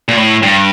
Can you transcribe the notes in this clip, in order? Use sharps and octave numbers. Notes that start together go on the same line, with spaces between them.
A#2
A2
G2